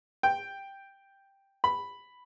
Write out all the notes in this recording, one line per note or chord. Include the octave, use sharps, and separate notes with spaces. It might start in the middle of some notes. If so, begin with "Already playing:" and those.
G5
B5